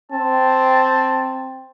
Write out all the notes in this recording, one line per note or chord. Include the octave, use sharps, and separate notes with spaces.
C4 A5